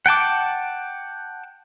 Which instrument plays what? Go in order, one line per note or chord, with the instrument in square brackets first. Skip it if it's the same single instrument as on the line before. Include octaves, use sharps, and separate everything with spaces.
[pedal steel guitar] F#5 G5 A5 D6